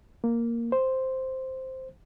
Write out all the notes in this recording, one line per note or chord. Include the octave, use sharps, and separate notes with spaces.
A#3
C5